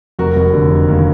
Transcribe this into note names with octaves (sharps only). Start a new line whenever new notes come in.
F1 F#4 A#4
F1
D3
F1
D#2